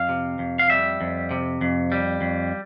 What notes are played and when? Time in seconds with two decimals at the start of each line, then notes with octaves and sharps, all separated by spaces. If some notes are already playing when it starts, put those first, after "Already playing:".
Already playing: F2 F5
0.09 C3
0.39 F2
0.59 F5
0.70 G3 E5
1.01 F2
1.31 C3
1.61 F2
1.92 G3
2.21 F2